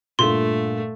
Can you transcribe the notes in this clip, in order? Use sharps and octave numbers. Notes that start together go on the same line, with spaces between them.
G2 A#2 A3 C6